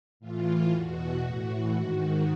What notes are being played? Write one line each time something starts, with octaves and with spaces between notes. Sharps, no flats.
A2 E3 F4
E2 B2 F#4
A2 E3 F#4
G#2 D#3